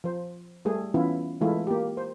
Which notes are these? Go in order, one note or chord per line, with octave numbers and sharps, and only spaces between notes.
F3 C5
G3 A3 G#4
E3 B3 C#4 E4 F4
E3 G#3 A3 E4 F4
A#3 G4
C5